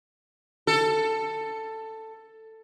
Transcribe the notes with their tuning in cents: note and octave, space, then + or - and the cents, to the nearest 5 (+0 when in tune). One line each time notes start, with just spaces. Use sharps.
A4 +10